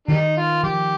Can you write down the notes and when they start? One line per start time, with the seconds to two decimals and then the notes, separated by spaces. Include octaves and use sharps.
0.08 D#3 G3 D#4
0.37 F4
0.64 F3 G4